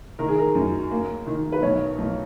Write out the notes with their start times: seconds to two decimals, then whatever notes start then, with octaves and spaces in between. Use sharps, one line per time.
0.19 D#3 A#4
0.28 G#4
0.38 A#4
0.55 F#2
0.91 A#3
1.26 D#3
1.52 B4
1.62 B1 C#5
1.98 B1